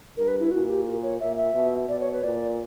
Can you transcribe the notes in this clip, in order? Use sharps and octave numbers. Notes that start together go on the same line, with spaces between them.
G2 A#4
B4
E4
A#2 F#4
G4
A#4
C#5
A#2 E5
E5
B2
B2 D5
C#5
B4
A#2 D5